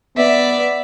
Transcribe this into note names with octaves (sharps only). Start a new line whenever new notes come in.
B3 D5 E5